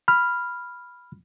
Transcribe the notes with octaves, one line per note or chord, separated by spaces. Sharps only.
B5 F6